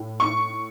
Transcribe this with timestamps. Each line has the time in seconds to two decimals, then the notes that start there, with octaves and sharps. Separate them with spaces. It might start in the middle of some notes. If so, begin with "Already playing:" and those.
Already playing: A2
0.20 C#6